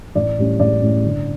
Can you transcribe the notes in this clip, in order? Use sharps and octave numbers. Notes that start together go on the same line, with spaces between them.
A1 D5
A2 G3 C#4
A1 D5
A2 G3 C#4
G1